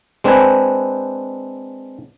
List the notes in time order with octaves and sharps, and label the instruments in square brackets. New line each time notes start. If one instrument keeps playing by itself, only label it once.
[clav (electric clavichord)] G#3 C4 D4 B4 C5 G#5